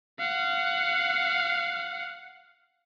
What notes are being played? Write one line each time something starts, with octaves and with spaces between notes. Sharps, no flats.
F5 F#5